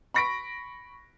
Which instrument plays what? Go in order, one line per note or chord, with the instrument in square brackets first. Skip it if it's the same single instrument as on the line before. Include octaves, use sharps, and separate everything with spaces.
[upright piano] B5 C#6 A#6 B6 D7